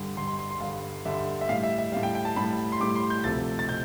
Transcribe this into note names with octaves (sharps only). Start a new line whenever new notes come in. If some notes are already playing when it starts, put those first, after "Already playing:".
Already playing: G2 D3 G3
G2 D3 G3 C6
C6
C6
C6
G2 D3 G3 F5
G2 D3 G3 E5
E5
A2 G3 F5
E5
E5
A2 G3 F5
G5
G5
A5
A2 G3 B5
C6
A2 G3 D6
C6
G6
D2 C3 F3 A3 A6
A6
C3 G6